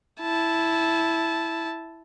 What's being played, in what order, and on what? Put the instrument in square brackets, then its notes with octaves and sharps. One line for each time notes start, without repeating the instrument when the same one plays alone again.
[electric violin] E4 A5